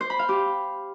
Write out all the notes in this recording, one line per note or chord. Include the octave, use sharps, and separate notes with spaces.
C5
B5
F5
G4